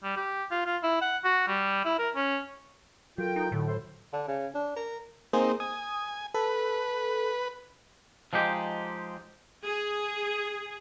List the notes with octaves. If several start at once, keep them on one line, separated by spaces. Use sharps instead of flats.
G3
G4
F4
F4
E4
F#5
F#4
G3
E4
A#4
C#4
F#3 F4 A4 A#4 G5
D#4
A2 D3
E4 A4 C5
D3
C#3
D4
A#4
A#3 C4 D#4 G#4 C5
G#5 D#6
A4 B4
F3 G#3 D#4 G4
G#4